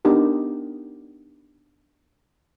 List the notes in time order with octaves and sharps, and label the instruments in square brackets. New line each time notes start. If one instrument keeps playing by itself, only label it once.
[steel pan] B3 D4 D#4 G4 A#4